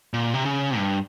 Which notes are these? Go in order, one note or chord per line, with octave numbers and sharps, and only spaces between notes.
A#2
C3
C#3
G2